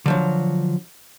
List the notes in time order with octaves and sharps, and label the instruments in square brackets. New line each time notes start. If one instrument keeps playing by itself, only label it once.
[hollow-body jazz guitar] D3 F3 F#3